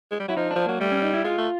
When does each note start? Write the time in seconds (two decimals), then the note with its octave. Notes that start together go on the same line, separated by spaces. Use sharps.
0.12 G#3
0.20 G3
0.28 F#3 E4
0.37 F3 D#4
0.51 D4
0.56 F3
0.66 F#3 A#3
0.80 G3 A3
0.91 C#4
1.02 D#4
1.13 E4
1.24 G#3 F4
1.38 A3